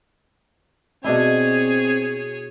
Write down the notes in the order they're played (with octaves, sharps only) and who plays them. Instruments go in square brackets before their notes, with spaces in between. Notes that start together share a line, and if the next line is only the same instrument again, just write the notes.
[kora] B2 D4 E4 [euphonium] C4 [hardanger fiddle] G#4 C#5